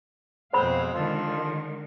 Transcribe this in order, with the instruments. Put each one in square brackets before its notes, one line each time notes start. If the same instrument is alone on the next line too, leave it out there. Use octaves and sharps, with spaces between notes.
[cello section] F2 B2 F5 [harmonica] G#3 C4 F#5 [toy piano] C5 B5
[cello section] D3 D#3 G#3 [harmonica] F3 F4 A4